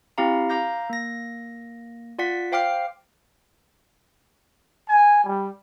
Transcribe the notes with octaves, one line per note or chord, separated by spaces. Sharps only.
C4 E4 G4 F5 A#5
F5 A#5 D6 G6 A#6
A#3 A#6
F4 D5 F#5 B6
C5 F5 G5 D6 F6 C7
G#5
G3